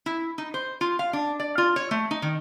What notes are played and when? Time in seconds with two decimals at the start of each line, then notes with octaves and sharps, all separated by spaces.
0.06 E4
0.38 D#4
0.54 C5
0.81 F4
0.99 F5
1.13 D4
1.40 D5
1.58 F4
1.76 C#5
1.91 A3
2.11 D#4
2.22 D#3